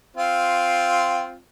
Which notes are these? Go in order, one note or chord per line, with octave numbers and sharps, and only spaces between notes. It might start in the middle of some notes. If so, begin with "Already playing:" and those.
C4 F4